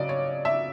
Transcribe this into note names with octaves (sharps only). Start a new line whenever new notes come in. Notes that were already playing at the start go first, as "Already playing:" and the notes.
Already playing: C#3 F#3 D5 D#5
C#5
E5